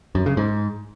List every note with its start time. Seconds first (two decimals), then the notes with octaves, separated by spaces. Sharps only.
0.15 F#2
0.26 C#3
0.37 G#2